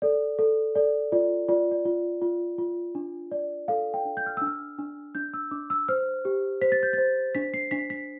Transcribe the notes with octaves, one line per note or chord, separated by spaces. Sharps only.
A4 D5
A4
A4 D5
F4 D5
F4 D5
D5
F4
F4
F4
D4
D5
A4 F5
G5
D4
G6
F6
D4 E6
F6
D4
D4 G6
E6
D4 D6
E6
C5 F6
G4
C5 B6
A6
G6
C5 A6
D4 B6
C7
D4 B6
B6